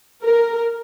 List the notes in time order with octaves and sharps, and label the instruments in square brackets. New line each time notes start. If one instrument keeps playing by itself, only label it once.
[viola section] A#4